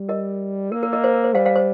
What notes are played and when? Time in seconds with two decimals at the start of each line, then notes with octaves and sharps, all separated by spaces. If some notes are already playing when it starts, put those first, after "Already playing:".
Already playing: G3
0.09 A#4 D#5
0.72 A#3 A#4
0.83 A#4
0.93 A#4 D#5
1.04 C5
1.14 A#4
1.24 C5
1.35 G3 C5 F5
1.45 C5 F5
1.56 C5